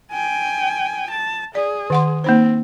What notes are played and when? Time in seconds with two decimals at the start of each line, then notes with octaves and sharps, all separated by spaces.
0.12 G5 G#5
1.11 A5
1.55 G#4 D5
1.90 D#3 F#5 C6
2.24 A#3 C4 D#4 C5